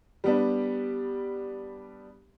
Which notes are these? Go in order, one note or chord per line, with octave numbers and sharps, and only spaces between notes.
G3 B3 D4